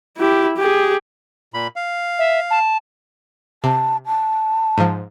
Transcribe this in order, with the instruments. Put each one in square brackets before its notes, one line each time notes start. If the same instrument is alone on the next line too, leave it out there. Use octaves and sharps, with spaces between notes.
[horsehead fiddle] E4 G4
G4 G#4
[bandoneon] A#2 B5
F5
[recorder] E5
A5
[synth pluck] C3 [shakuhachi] A5
[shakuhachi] A5
[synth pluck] G#2 F3